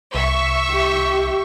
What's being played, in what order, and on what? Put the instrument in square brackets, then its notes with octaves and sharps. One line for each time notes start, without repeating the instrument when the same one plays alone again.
[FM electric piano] C2 [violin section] E5 C#6
[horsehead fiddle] G4